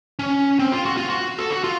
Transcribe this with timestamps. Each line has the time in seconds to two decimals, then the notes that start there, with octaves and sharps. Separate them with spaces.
0.19 C#4
0.59 C4
0.72 F4
0.85 F#4
0.97 F4
1.10 F#4
1.38 A4
1.51 F#4
1.64 F4